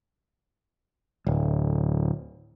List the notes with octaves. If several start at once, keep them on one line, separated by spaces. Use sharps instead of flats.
D1